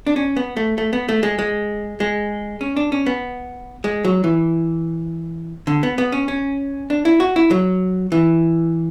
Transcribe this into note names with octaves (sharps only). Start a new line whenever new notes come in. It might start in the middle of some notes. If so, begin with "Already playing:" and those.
D4
C#4
B3
A3
A3
B3
A3
G#3
G#3
G#3
C#4
D4
C#4
B3
G#3
F#3
E3
D3
B3
B3
C#4
C#4
D4
E4
F#4
E4
F#3
E3